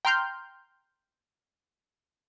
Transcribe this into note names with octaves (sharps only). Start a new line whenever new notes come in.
G5 A#5 C6 F6 G6